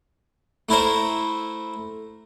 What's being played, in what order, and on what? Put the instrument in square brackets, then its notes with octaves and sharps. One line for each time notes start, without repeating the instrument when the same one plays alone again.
[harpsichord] A3 E4 A#4 C5